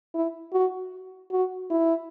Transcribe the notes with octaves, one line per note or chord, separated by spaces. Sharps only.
E4
F#4
F#4
E4